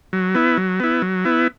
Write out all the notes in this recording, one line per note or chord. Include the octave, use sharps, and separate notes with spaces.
F#3
B3 E4
F#3
B3 E4
F#3
B3 E4